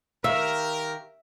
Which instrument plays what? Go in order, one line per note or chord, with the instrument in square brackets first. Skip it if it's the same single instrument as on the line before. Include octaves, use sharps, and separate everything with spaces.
[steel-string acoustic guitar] D#3 F5 [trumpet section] G4 A#4 [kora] E5